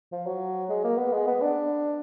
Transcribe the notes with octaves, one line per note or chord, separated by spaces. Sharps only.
F3
F#3
G#3
A#3
B3
G#3
B3
D4